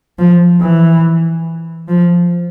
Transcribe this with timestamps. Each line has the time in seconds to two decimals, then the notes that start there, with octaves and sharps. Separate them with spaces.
0.19 F3
0.61 E3
1.88 F3